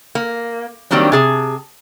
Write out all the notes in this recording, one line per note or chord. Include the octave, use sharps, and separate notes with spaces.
A#3
D#3 F#3 G3 A#3 C4 D4
C3 G#4 A5